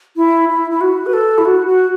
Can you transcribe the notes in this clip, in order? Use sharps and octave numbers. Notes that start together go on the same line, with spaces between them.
E4
E4
E4
F#4
B4
A4
E4
F#4
F#4